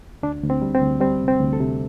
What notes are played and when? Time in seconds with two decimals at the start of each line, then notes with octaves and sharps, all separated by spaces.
0.23 D2 D4
0.43 D2
0.50 C4
0.62 G3
0.75 C4
0.82 D2
1.01 G3 C4
1.21 C3
1.28 C4
1.40 D2
1.53 A4
1.60 C3